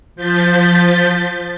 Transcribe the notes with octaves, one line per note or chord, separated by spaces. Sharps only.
F3 G6 A6 B6